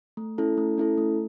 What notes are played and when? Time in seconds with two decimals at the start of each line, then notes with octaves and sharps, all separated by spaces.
0.17 A3
0.38 C#4 E4 A4
0.58 A3
0.78 C#4 E4 A4
0.98 A3